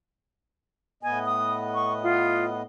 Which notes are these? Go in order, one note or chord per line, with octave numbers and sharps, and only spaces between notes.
A2 B3 D#5 G#5
D#6
C#6
F4